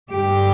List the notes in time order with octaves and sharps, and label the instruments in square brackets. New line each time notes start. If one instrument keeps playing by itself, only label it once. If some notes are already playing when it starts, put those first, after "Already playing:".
[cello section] G2 D3 G4